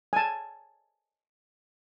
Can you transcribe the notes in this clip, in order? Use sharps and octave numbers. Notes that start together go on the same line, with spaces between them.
G#5 A5